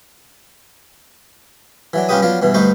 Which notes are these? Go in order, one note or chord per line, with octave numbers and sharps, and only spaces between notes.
E3 F#3 D4
G2 C#4 F4 G4 B4 D#6
F3 F#3 B3 D4 F4
G2 B2 E3
D2 G2 D#4 B4 C5 C#6